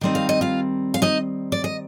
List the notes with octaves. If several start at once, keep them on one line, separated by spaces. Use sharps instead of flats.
D#3 G3 C4 D#4
F5
D#5
F4 F5
F5
D#4 D#5
D5
D#5